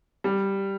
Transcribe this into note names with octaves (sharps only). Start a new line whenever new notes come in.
G3